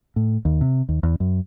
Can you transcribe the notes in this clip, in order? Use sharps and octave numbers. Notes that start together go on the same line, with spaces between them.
A2
D#2
C3
D#2
E2
F#2